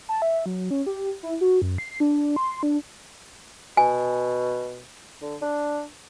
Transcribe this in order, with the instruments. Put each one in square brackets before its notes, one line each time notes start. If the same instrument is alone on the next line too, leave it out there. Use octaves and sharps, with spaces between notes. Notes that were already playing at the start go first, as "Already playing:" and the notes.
[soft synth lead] A5
E5
F#3
C#4
G4
E4
F#4
F#2
C7
D4
C6
D4
[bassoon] B2 [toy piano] G#5
[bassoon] D3
D4